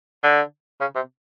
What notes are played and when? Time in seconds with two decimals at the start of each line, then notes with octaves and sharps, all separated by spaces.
0.24 D3
0.81 C#3
0.95 C3